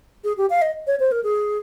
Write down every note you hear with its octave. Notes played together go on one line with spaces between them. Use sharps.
G#4
G4
F5
D#5
C#5
C5
A#4
G#4